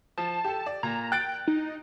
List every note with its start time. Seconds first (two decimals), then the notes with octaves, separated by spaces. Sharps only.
0.18 F3 A5
0.44 G4 A4
0.66 D5
0.83 A#2 A#5
1.12 G5 F#6 A6 D7
1.48 D#4